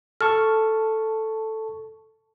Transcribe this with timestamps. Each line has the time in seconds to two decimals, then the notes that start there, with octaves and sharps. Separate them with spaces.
0.21 A4 A5 C#6 F6